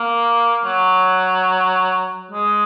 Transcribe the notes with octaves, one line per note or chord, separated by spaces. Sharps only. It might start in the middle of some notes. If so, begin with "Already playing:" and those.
Already playing: A#3
F#3
G#3